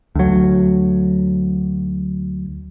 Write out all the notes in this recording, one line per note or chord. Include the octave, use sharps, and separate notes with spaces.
D2 F#3